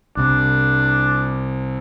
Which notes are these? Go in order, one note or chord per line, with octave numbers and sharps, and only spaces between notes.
C2 C3 D4